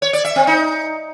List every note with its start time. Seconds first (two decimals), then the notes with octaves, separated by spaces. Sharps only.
0.02 C#5
0.13 D5
0.25 E5
0.36 C4
0.47 D#4